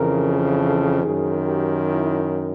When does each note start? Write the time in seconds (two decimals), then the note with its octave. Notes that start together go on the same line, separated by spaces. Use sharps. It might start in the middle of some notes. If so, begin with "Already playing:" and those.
Already playing: F2 C#3 E3 A#4
0.57 A4
1.02 F#2 D#3 G#4
1.47 G4
1.92 E4